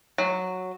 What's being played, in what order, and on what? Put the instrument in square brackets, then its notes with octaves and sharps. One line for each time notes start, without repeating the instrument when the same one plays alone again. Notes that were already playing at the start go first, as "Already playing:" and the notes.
[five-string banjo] F#3